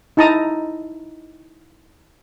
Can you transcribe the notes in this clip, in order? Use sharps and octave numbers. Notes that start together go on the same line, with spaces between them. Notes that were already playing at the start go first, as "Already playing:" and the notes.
D#4 E4 A5 A#5 D#6